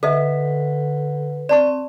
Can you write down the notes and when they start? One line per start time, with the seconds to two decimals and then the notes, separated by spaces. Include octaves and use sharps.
0.03 D3 A4 B4 D#5 E5
1.49 C4 D5 A5 C#6